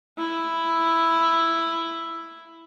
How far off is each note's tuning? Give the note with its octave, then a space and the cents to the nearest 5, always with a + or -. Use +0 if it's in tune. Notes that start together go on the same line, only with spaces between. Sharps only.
E4 +5